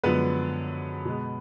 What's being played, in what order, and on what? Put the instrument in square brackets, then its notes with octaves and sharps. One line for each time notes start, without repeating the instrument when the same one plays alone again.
[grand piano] F#2 D3 F3 G#3 B3 B4
B2 G#3